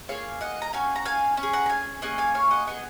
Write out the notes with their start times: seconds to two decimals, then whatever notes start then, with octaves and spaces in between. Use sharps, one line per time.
0.08 A#3 F4 G#4 C#5 F5
0.41 D#5 F#5
0.62 A#5
0.73 C#4 F#4 F5 G#5
0.96 A#5
1.06 F5 G#5
1.37 C#4
1.43 G#4
1.53 F#5 A#5
1.66 A#5
1.69 F5 G#5
2.02 A#3 C#4 G#4 D#5 F#5
2.18 F5 G#5
2.35 C#5 F5
2.51 D#5 F#5
2.67 B3 D#4 G#4 D#5 F#5